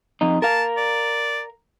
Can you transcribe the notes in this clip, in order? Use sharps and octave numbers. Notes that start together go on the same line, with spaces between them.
F2 D#4
A#4 F5 A5
D5